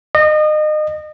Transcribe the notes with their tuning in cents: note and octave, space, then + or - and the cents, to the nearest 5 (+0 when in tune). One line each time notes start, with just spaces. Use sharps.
D#5 -30